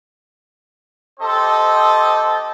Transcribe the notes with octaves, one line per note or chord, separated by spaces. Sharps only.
C4 G4 A4 C5 D#5